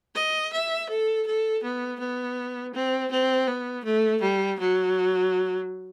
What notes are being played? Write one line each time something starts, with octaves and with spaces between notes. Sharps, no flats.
D#5
E5
A4
A4
B3
B3
C4
C4
B3
A3
G3
F#3